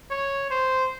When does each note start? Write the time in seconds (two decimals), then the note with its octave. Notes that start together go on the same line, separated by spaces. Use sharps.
0.11 C#5
0.51 C5